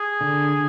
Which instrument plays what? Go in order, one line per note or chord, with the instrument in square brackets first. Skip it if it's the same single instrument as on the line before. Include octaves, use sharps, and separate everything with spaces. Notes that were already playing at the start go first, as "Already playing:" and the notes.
Already playing: [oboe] G#4
[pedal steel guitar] D3